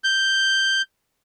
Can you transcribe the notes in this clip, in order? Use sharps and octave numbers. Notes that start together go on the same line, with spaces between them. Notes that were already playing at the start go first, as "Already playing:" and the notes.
G6